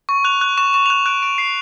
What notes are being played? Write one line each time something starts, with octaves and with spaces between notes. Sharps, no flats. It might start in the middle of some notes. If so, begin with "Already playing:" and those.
C#6
F#6 F7
F#6
C#6 E7
C#6 E7
F7
F#6 E7
F#6 D7
C#6 D7
C#6 C7